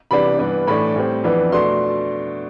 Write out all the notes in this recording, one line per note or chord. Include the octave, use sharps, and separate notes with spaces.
C3 E3 G3 B3 D4 B5
G2 E3 B3 D4
A2 E3 A3 D4 B5
A2 G3 C4
F2 E3 B3 D4
B2 A3 D4 C6